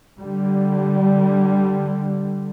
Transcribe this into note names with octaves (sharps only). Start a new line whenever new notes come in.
D3 G3